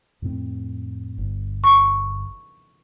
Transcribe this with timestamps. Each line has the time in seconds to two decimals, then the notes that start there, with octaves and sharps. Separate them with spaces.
0.22 F2 A2 C4
1.18 G1
1.64 C#6